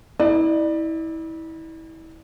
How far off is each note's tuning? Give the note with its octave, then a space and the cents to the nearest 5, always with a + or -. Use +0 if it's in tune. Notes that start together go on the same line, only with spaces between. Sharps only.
E4 -30 D5 +25